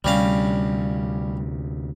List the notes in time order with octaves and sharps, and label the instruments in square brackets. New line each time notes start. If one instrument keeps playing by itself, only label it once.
[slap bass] D2 C3 [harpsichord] G3 C#4 F5